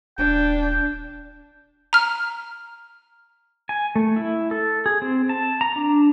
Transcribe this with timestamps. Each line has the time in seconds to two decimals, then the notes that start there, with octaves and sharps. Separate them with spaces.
0.18 D#1 D4 G5
1.93 A#5 F6
3.69 G#5
3.96 A3
4.16 E4
4.51 A4
4.86 G#4
5.02 C4
5.29 A5
5.61 A#5
5.76 D4